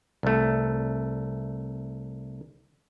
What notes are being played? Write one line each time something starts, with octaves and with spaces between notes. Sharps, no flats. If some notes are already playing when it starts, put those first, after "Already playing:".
C2 A3